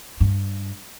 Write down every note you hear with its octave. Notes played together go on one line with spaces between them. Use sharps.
G2